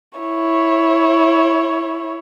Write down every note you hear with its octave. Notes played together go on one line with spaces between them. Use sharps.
E4 C#5